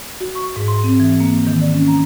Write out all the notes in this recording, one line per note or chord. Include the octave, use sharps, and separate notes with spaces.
F#4
C#6
G#2
C6
C4
E3
A#3
D#3
D5
C#4
A#5